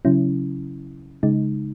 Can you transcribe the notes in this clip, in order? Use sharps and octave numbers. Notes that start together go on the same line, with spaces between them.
C#3 F#3 C#4 E4
C#3 G#3 D#4